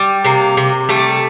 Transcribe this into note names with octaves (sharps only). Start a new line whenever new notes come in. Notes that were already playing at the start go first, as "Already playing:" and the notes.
Already playing: G3
C3 A#3
C3
G3 A3